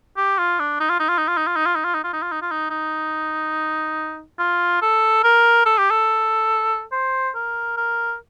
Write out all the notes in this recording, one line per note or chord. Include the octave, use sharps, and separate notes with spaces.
G4
F4
D4
D#4
F4
D#4
F4
D#4
F4
D#4
F4
D#4
F4
D#4
F4
D#4
F4
D#4
F4
D#4
F4
D#4
D#4
F4
A4
A#4
A4
G4
A4
C5
A#4
A#4